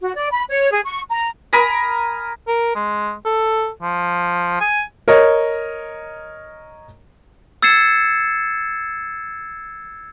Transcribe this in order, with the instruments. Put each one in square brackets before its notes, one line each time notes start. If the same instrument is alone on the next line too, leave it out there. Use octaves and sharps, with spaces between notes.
[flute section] F#4
D5
B5
C#5
G#4
C#6
A#5
[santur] A#4 G#5 B5 D#6
[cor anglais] A#4
G#3
A4
F3
G#5
[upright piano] A#4 C#5 D#5
[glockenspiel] E6 G#6 A6 C7 C#7 E7